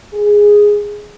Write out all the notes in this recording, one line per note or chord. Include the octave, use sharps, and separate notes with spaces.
G#4